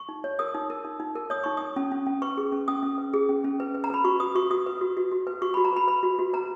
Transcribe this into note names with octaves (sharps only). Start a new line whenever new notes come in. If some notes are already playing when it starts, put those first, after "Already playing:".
Already playing: C#6
D#4
C#5
A#4 D#6
D#4
A#4
D#4
D#4
A#4
C#5 D#6
D#4 C#6
D#4 D#6
C#4
C#4
C#4
B4 C#6
G#4
C#4
C#4 D#6
C#4
B4
G#4
C#4
C#4
B4
B4
A#5
B4 B5
F#4 C#6
B4 D#6
F#4 C#6
F#4 D#6
B4
F#4
F#4
F#4
B4
F#4 C#6
B5
F#4
A#5
B4 B5
B4 B5
F#4
F#4
B4 A#5